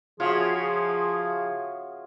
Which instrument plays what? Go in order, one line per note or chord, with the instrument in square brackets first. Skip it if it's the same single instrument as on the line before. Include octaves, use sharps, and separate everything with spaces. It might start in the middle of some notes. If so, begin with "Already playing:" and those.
[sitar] C#3 [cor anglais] F3 [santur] F4 F#4 E5 [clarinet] G#4